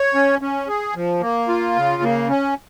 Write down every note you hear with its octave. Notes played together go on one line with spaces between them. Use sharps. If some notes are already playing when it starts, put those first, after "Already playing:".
Already playing: C#5
C#4
C#4
G#4
F3
A#3
F4
C#3
A#3
C#4